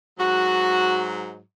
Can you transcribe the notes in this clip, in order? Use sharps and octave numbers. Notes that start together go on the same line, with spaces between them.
G#2 F#3 F#4